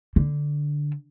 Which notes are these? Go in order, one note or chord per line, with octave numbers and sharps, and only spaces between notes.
D3